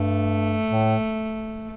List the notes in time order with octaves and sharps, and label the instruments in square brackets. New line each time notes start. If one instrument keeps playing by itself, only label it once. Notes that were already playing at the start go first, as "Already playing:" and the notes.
Already playing: [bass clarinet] G2 [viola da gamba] A3
[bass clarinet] A2